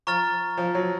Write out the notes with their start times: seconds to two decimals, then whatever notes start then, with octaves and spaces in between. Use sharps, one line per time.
0.07 F3 A#5 C#6 F6 A6
0.57 F3
0.75 F#3